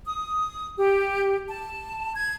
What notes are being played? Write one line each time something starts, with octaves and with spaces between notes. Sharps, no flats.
D#6
G4
A5
G#6